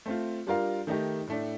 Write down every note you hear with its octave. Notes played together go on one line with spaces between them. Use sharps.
A3 C4 F4
G3 D4 F4 A#4 F5
D#3 A3 D#4 G4
A2 A3 D4